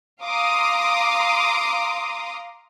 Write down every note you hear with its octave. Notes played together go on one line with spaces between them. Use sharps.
F5 A#5 C6 D6 D#6